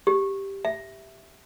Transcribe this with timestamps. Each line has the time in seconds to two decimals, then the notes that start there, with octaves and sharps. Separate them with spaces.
0.07 G4
0.65 E5